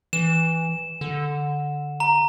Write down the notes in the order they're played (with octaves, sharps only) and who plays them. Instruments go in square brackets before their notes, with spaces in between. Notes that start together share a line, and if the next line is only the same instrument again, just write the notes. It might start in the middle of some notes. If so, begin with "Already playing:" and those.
[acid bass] E3 [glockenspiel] E7
[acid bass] D3
[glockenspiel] A#5